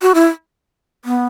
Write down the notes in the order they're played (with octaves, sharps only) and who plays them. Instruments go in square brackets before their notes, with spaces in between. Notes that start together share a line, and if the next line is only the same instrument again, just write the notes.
[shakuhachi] F#4
E4
B3